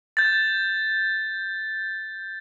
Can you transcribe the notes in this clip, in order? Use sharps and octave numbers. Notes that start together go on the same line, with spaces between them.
G6 A6